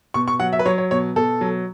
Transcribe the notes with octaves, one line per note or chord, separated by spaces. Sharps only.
B2 C#6
C#6
F#3 F#5
E5
B4
F#3 C#5
C#5
B2 C#5
B2 A4
F#3